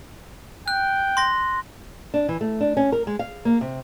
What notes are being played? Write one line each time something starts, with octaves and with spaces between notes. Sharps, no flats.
G5 F#6
C6 A#6
D4
E3
A3
D4
C#4
A#4
G#3
F5
A#3
C3